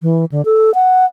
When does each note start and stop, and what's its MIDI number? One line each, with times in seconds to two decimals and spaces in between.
0.02 0.25 52
0.32 0.44 50
0.45 0.73 69
0.74 1.05 78